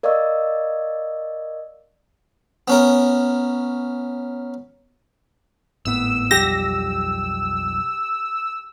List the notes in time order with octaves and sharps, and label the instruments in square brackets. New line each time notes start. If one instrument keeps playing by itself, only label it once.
[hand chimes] A#4 D5 D#5 F5 C#6 E6
[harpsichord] B3 C#4 A#4
[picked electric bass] G#1 A2 B3 [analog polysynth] E6
[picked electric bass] B1 F2 G3 [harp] G4 [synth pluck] A#6